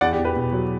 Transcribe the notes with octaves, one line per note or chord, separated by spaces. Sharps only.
E2 D5 F#5
G4
E2
G4 B4
B2
F#3